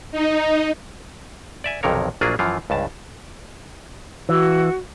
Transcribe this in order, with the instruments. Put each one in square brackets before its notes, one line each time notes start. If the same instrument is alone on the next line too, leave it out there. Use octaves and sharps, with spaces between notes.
[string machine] D#4
[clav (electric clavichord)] D5 E5 G#5
B1 F2 C3 D#3 A#4 C#5
A#1 F#3 A#3 D4 F4 G#4
F#2 E3 F3 F4
C#2 G2 A5
[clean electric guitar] E3 [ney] F#4